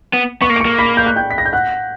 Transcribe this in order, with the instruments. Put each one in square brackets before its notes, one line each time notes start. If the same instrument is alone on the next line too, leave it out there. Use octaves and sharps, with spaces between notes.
[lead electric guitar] B3
[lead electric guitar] B3 [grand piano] C#6 C#7
[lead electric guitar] A#3
[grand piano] D7
[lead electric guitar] A#3 [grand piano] C#6 C#7
[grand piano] B5 B6
G6
F#6
G5 G6
B6
A#6
G6
F#5 F#6